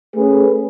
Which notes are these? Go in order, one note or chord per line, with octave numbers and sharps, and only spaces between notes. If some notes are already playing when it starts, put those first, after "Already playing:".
A3 C#4 G#4 B4